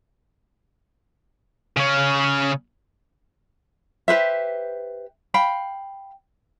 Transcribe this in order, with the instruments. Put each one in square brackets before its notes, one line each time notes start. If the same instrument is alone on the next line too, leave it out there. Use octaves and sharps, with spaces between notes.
[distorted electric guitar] C#3 C#4
[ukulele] G4 B4 C5 E5
F5 G5 B5